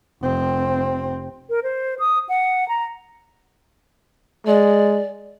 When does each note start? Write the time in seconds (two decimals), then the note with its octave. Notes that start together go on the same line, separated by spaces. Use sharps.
0.22 F1 C4
1.50 A#4
1.63 C5
1.99 D#6
2.29 F#5
2.68 A#5
4.47 G#3 D5